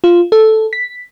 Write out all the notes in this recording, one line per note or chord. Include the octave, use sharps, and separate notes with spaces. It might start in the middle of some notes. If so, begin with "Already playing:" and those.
F4
A4
B6